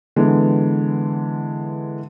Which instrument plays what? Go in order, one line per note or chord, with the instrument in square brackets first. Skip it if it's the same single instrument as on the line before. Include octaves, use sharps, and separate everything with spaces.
[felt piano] D3 E3 G#3 B3